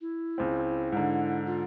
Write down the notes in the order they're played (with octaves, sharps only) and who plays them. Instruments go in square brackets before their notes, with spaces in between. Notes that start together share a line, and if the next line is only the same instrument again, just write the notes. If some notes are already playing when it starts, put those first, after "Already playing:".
[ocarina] E4
[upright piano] C#2 C4
G#2 D3
[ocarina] F4